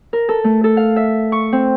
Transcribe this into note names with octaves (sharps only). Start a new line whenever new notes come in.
A#4
A4
A3
A4
F5
E5
C#6
C4